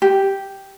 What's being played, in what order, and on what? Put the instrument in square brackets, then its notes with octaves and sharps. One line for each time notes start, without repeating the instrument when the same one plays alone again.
[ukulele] G4